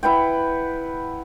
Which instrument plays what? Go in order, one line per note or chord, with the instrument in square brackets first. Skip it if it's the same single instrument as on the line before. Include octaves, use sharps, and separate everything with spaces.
[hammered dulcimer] E4 B4 F#5 G5